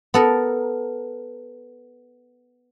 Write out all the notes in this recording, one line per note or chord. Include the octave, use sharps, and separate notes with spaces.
B3 A4 A#4